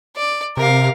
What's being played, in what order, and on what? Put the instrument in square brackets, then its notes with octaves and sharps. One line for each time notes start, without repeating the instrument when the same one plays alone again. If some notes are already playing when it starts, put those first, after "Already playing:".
[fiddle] D5
[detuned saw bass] C3 [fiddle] A#4 F5